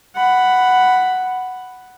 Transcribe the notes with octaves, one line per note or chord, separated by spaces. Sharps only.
F#5 B5